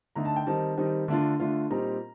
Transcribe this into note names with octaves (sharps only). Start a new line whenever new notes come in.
D3 A3 D#4 A#5
A5
G5
D#3 G3 C4 D#4 A5
D#3 G3 C4 D#4
D3 A3 D4 F4
D3 A3 D4 F4
A#2 G3 C4 D#4 A#5